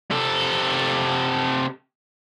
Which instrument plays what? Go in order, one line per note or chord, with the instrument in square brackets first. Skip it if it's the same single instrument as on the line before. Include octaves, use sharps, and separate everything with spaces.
[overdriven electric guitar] C3 A4